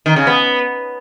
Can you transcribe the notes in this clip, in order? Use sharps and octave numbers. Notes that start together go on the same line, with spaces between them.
D#3
C#3
B3